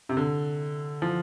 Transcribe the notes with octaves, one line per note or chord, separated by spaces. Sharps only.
C3
D3
F3